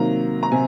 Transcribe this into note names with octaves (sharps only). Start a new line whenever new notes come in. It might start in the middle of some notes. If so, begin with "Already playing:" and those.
Already playing: C3 D#3 F#3 A#3 A#5
A#5
C3 G#5